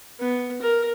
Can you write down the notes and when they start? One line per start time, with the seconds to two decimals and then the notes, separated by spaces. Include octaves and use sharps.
0.20 B3
0.62 A#4